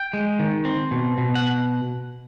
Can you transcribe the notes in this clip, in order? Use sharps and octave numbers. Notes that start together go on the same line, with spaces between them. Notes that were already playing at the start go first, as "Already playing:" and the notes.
Already playing: G5
G#3
D#3
C4
B2
B2
F#5